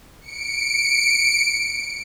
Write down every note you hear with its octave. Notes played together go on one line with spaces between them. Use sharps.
C#7 D7